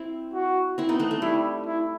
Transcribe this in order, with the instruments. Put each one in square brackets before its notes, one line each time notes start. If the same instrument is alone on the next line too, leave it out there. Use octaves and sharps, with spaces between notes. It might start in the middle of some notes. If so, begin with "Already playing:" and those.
Already playing: [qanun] C4 E4
[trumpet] F#4
[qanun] C4 E4
B3 D#4
A3 C4
A3
[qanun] G3 [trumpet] E4
[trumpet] E4